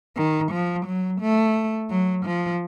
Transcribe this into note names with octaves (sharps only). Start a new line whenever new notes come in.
D#3
F3
F#3
A3
F#3
F3